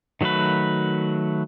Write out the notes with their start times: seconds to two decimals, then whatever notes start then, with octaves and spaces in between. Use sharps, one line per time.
0.21 D#3 F#3 A3 F#4 B4